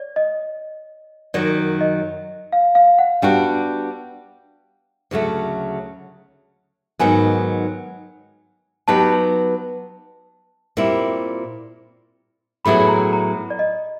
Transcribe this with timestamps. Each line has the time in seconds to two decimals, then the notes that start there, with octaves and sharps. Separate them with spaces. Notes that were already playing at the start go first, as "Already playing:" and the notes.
Already playing: C#5 D5
0.16 D#5
1.34 F#2 D#3 F#3 D5
1.81 D#5
2.52 F5
2.75 F5
2.99 F#5
3.22 G3 B3 D4 F#4 G5
5.11 D2 C#3 F#3 A3
6.99 G#2 D#3 F#3 B3 G#5
8.88 F#3 B3 D#4 G4 B4 A5
10.77 A#2 G3 C4 E4
12.65 A2 F#3 B3 E4 G#4 B5
12.88 A#5
13.13 A#5
13.50 D5
13.59 D#5